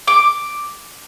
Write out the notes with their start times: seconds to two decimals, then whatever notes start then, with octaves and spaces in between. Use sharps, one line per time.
0.07 D6